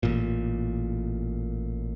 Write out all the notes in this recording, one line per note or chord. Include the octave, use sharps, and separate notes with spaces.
A1 A#2